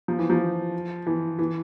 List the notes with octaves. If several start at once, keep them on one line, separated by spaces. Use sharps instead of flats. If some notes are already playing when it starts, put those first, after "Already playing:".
F3
E3
F3
E3
E3